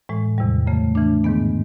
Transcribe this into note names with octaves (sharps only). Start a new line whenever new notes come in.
A2 E3 G#3
E2 C3 D#3 G3
F#2 C#3 E3 A3
C#3 E3 A3 D4
G#2 D#3 G#3 B3